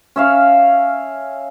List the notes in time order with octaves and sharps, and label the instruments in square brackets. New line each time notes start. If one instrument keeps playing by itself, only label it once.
[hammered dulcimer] C#4 E5 F5